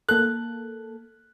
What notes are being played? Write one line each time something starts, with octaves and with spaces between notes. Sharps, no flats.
A#3 A4 F#6